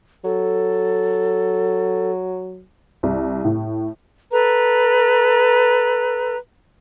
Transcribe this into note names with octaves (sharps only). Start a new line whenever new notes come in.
F#3 A4
C2
A2
A4 B4 A#5